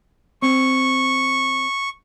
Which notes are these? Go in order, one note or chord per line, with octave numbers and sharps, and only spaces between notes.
C4 C#6